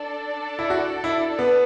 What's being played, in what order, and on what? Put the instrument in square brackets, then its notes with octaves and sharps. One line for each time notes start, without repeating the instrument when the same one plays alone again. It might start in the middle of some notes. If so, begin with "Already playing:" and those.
Already playing: [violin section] D4 A4 D5 A5
[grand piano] E4
F#4
E4
B3